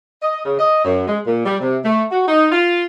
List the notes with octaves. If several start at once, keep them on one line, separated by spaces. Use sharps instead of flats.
D#5
C#3
D#5
F#2
G#3
A#2
G3
C3
A3
F#4
D#4
F4